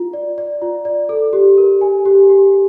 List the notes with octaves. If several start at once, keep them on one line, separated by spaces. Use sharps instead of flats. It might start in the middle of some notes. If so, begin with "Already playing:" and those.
Already playing: F4
D5
D5
F4
D5
A4
G4
A#4
G#5
G4
G4